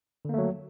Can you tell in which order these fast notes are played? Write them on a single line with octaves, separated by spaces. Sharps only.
D3 A#3 A3 F#3